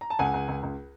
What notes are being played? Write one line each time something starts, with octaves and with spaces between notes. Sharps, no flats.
A#5
A5
C#2 F#5 G#5
C#2
C#2
C#2